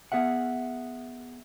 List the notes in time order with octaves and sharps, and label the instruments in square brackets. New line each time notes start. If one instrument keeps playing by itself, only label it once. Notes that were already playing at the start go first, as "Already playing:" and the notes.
[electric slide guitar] B3 G#4 E5 F#5